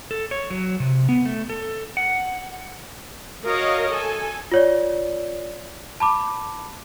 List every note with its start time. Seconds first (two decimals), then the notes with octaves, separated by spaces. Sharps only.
0.11 A4
0.31 C#5
0.50 F#3
0.80 C3
1.09 B3
1.26 A3
1.50 A4
1.97 F#5
3.45 F#4 A#4 C#5 D#5 F5
3.92 A4 G#5
4.52 F4 C#5 D5
6.00 A5 B5 D6